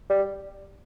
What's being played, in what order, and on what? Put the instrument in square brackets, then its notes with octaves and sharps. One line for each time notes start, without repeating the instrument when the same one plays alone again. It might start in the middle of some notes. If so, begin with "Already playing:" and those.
[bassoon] G3